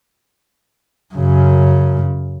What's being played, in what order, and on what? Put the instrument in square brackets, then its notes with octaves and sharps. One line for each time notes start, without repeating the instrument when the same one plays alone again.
[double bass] F#2 C#3